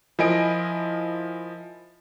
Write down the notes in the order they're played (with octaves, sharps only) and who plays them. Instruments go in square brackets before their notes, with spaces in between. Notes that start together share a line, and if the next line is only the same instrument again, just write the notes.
[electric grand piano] F3 E4 A#4 D#5 G#5 D7